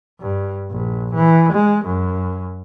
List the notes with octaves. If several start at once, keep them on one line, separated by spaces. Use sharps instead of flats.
G2
A#1
E3
G#3
F#2